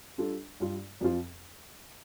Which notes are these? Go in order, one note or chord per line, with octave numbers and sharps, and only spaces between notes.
G3 D4 F4 A4
G2 G3 F4
F2 F3 C4 F4